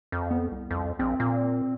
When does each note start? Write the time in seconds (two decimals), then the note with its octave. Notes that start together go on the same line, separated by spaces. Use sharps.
0.12 F2
0.31 B3
0.51 C2
0.71 F2
0.99 A#1 C4
1.20 A#2